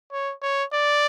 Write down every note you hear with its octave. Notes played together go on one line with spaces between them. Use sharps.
C#5
C#5
D5